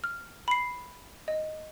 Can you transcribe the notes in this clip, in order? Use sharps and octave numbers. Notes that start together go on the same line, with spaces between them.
F6
B5 C7
D#5